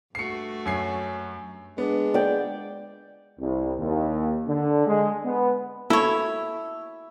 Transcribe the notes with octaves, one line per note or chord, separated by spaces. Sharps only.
G2 A3 F#4 C7 C#7
F#2 G#5 C7
G#3 B3 D4
D5 G5
C2
D#2
D3
G#3
B3
E4 A4 C#5